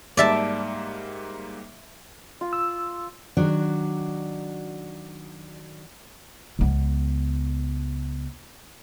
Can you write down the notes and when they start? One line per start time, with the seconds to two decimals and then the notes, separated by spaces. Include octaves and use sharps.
0.17 G#2 G3 A#3 D5 E5 A5
2.41 F4
2.53 E6
3.37 D#3 F#3 D4 F#4
6.59 C#2 B3